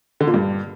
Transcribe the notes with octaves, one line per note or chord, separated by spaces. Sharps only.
D3
A#2
G2